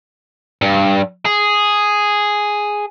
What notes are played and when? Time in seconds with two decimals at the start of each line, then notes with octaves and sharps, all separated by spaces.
0.62 G2
1.25 G#4